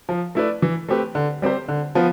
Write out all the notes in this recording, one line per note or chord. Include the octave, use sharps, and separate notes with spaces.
F3
A3 E4 B4 D5
E3
A3 C4 G4 B4
D3
G3 C4 G4 C5
D3
F3 B3 F4